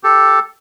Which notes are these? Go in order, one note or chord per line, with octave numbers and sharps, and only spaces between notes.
G4 A4